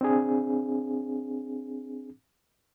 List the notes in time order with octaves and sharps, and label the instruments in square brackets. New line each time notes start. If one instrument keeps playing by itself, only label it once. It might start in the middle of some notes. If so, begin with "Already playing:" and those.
[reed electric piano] C4 D4 G#4